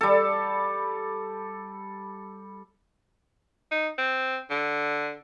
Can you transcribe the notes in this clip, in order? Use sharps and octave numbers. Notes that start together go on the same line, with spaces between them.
G3 A4
D#4
C4
D3